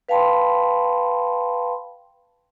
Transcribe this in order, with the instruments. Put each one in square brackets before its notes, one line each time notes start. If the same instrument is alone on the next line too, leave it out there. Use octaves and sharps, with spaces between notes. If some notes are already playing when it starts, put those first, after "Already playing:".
[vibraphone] B4 F5 G5 A5 B5 C6